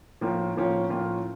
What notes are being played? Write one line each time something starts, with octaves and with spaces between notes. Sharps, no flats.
A2 F3 A#3 C#4 F4
A2 F3 A#3 C#4 F4
A2 F3 A#3 C#4 F4